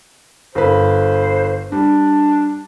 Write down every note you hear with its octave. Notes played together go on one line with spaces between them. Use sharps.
G1 B4 C5
G3 D4